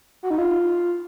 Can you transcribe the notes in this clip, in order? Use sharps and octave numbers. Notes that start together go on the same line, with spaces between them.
F#4
D#4
F4